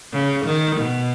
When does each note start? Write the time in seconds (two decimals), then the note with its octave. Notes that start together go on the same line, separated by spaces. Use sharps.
0.13 C#3
0.45 D#3
0.76 B2